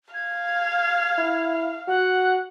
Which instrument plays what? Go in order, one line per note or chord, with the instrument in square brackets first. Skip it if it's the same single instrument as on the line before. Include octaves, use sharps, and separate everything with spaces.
[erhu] F5 [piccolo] G#6
[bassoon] E4
[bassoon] F#4 [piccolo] F#5